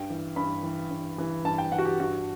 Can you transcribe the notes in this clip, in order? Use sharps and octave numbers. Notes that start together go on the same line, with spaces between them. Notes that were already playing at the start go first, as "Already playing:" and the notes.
Already playing: G2 G5
E3
G2 B5
E3
G2
E3
G2 A5
G5
E3 F#5
F#4
G4
G2 F#4